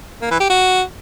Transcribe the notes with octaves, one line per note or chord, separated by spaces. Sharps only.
A#3
E3
G4
F#4